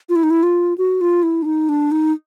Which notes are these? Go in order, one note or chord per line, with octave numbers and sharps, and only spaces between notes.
F4
E4
D#4
E4
F4
F#4
F4
E4
D4
D#4
D4
D#4